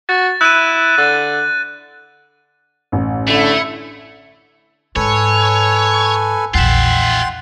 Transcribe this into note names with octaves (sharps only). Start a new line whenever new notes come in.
F#4 A6
E4 F#6 D#7
D3 A6
A1
D3 A3 E4
G#2 A4 B4 C#5 G#5
A#1 E2 F4 E5 F#5 G5 C6